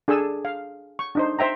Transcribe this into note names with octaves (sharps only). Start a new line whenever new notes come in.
D4 G#4 A4 G#5 E6
F5
C#6
D4 D#4 C5
C5 E5 G5 A#5